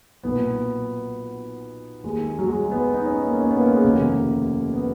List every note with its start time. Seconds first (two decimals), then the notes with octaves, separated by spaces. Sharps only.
0.23 B1 A#2 B3
2.03 D#2 D#3 G#3
2.39 F#3
2.48 G#3
2.71 B3
2.94 D#4
3.06 C#4
3.27 A#3
3.39 C#4
3.51 B3
3.61 A#3
3.72 G#3
3.83 F1 D#2 C#3 A#3
4.74 B3